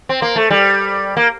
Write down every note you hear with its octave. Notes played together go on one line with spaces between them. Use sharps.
C4
A#3
A3
G3
A#3